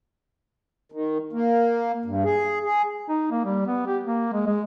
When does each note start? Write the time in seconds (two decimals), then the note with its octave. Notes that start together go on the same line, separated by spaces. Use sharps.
0.92 D#3
1.33 A#3
2.05 G2
2.24 G#4
2.64 G#4
3.09 D#4
3.31 A#3
3.45 G3
3.67 B3
3.87 G4
4.04 A#3
4.33 G#3
4.46 G#3